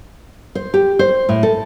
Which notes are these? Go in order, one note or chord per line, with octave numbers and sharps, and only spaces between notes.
C5
G4
C5
A2
A4